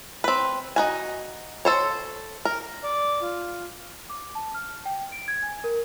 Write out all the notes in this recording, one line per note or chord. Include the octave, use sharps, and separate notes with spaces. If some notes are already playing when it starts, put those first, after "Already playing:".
C4 B4
D#4 F#4 G#5
A4 C5 C#5
A#4
D5
F4
D6
A5
F6
G5
D7
G#6
G#5
A#4